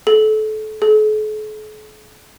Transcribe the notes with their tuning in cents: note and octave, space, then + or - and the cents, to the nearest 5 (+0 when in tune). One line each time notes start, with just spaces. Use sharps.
A4 -30
A4 -45